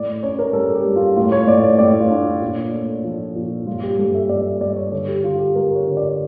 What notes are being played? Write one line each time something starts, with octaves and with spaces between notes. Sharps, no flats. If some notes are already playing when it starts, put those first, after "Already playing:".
Already playing: A2 D5
C#4 C#5
A#4
G3 A4
G4
G3
F4
A2 F4
C#5
A2 D5
D5
A2 D5
F4
D4
A#2
A3
F3
A#2
G2 F4
G4
G2 A4
E5
G2 D5
E5
G2 D5
C#5
D3 A4
G4
D3 F4
G4
G3 A#4
C#5
D3
D5